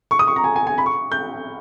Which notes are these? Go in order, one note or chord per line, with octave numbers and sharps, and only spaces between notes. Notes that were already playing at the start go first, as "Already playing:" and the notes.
C#6
D#6
C#6
A#5
G#5
G#5
G#5
B5
C#6
G6